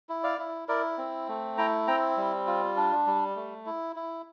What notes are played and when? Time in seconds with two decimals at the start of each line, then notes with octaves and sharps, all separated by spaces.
0.09 E4
0.23 D5 F5
0.39 E4
0.68 E4 A#4 D5
0.98 C4
1.28 A3
1.58 E4 G5 A#5
1.87 C4 G5 A#5
2.17 G3
2.47 F4
2.77 D4
3.07 G3
3.36 A3
3.66 E4
3.96 E4